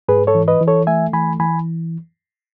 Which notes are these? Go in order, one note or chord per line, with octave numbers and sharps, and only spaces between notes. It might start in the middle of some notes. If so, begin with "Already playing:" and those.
G#2 G#4 B4
A4 C#5
E3
B4 D#5
E3
A4 C#5
A3 E5 G#5
E3 G#5 B5
E3 G#5 B5